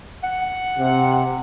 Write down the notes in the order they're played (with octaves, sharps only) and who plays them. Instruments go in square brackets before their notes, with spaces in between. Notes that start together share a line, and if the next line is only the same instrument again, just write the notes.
[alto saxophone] F#5
[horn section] C3